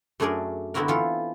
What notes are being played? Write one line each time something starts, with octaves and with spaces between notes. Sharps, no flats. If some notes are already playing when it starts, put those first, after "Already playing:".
F#2 A3 D4 G#4 A#4 D5
D3 B3 C4 E4 F#4 A#4
E3 F4 A4